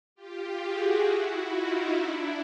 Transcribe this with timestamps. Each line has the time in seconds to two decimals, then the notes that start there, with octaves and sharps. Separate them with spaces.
0.15 F4 G4
0.60 F#4 G#4
1.03 E4 F#4
1.48 D#4 F4
1.92 D4 E4